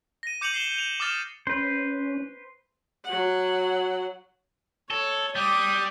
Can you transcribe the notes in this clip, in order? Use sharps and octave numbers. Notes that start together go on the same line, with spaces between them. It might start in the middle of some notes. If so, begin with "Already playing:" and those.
A#6 D#7
D6 G6 C#7 D#7 F7 F#7
C7 E7 G7
D#7 F7
D6 D#6 F6 A6 E7
C#4 B4 C5
F#3 F#5
A4 C#5
G3 D6 D#6